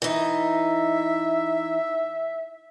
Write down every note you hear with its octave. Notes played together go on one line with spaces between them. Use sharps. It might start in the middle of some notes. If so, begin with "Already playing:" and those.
E3 D#4 E5